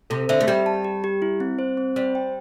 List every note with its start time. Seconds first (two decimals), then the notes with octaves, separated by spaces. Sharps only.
0.10 C3 A4
0.29 D3 E5
0.41 A3
0.47 G3 G4
0.66 A5
0.85 G4
1.04 G4
1.22 E4
1.40 C4
1.59 C5
1.77 C4
1.96 G3 C5
2.15 G5